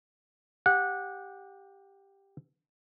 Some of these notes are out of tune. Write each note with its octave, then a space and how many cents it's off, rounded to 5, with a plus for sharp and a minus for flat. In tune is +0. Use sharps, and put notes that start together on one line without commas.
G4 +5 F#5 -20